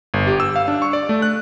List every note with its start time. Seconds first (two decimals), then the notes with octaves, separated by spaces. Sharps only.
0.14 G1
0.27 G4
0.40 E6
0.56 F5
0.68 D4
0.82 C#6
0.93 D5
1.09 A3
1.22 F#6